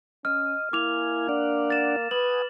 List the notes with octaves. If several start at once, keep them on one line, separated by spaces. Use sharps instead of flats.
C#4 D#5 F6
A#3 E4 G#5 D6 F7
D4 D5 F#5
A6 E7
B4 F#5 G#5 D#6 F#7